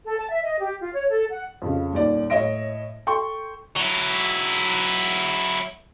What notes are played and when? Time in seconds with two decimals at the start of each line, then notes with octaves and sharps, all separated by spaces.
0.05 A4
0.18 A5
0.30 E5
0.43 D#5
0.61 G4
0.81 F4
0.93 C#5
1.10 A4
1.31 F#5
1.62 F2 C#3
1.93 D#1 D#2 D5
2.30 A2 C#5 D#5 E5 A#6 D7
3.07 A4 G5 C6 C#6
3.77 F#3 E4